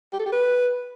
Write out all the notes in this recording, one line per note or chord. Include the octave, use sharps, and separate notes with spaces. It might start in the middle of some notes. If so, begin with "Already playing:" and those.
G4
A4
G4
B4